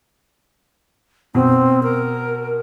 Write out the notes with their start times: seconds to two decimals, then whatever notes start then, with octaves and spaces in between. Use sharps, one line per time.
1.35 B2 C4
1.83 A#4